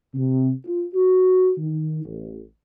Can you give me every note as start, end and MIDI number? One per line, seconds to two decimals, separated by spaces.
0.15 0.50 48
0.66 0.86 65
0.95 1.50 66
1.58 2.04 51
2.05 2.41 33